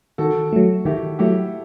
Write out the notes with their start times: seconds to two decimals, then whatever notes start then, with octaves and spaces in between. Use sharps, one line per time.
0.18 D#3 F#4 A4
0.53 F#3 A3
0.85 D#3 E4 G4
1.19 F#3 A3 E4 G4